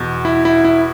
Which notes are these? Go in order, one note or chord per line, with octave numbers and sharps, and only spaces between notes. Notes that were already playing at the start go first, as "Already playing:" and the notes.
Already playing: E2 B2
E4
E4
E4